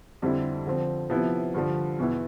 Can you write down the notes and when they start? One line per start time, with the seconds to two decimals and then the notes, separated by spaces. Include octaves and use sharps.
0.22 F2 D3 G3 C4 E4
0.66 D3 F3 C4
1.10 C3 F3 B3 E4
1.54 G2 D3 F3
1.98 E2 B2 B3 E4